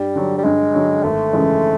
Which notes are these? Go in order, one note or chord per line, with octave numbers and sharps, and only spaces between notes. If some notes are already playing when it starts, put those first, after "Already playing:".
Already playing: G2 G3
D3 F#3
G3
G2 G#3
D3 F#3
G#1 A3
F#2 C#3 E3 G#3